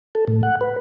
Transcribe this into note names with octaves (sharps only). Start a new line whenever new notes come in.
A4
A2
F#5
B4